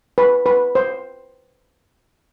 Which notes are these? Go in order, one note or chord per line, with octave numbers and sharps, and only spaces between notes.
B4
B4
C5